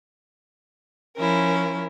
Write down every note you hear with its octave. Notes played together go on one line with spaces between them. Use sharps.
F3 C#4 E4 A#4